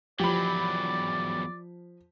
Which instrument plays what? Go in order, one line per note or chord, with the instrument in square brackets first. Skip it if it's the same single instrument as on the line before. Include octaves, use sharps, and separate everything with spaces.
[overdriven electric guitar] E2 F#3 [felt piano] F3 [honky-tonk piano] G4 B5 [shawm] D5